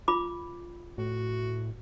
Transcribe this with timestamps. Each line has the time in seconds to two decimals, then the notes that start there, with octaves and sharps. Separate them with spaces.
0.08 F4 B5 D6
0.98 A2 F#4